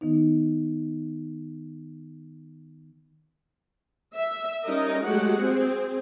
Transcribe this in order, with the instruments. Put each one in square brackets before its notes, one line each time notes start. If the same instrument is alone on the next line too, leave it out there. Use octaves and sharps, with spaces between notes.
[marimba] D#3 B3 D#4
[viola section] E5
G3 C#4 D#4 A#4 D#5
F#3 G#3 A3 F#4 G4 F#5
C4 G#4